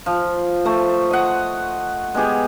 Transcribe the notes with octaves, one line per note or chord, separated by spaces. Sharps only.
F3
A3 C5
D#5 F#5
G#3 B3 G4 G#4